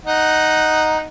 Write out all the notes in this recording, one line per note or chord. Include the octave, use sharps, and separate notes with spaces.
D#4 F#5